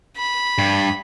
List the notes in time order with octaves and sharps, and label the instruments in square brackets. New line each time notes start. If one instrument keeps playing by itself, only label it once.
[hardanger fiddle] B5
[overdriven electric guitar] G2